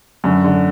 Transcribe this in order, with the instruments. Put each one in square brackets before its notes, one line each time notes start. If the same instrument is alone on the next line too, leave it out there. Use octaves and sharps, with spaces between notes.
[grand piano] F#2 [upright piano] D3
[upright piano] D3